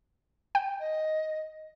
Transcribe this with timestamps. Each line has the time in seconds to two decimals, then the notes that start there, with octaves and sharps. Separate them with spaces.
0.55 G5
0.80 D#5